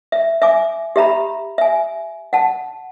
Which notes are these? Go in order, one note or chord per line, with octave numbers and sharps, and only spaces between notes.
E5
E5 G#5 D6
G4 E5 A#5 B5
E5 G#5
F#5 A5